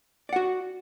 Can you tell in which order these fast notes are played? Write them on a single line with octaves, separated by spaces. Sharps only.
D5 F#5 F#4